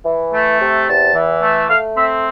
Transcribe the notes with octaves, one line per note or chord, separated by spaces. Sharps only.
E3
A3
C3
E2 A5
E3
A3
A3 F5
C4 E5